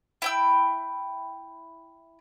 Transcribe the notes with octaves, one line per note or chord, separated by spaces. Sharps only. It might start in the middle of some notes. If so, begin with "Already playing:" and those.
E4 G5 E6